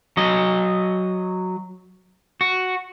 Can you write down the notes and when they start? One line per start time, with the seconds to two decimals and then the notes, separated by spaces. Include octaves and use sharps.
0.17 F#3 D#5
2.41 F#4